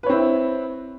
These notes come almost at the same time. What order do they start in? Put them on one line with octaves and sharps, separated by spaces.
B4 C#5 C4 E4